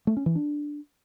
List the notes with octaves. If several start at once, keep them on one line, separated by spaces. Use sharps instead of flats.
A3
C#4
E3
D4